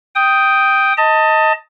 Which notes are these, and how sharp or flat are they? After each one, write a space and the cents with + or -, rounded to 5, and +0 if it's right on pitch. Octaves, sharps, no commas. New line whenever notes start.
G5 +0 D#6 +5
D#5 +15 A5 +25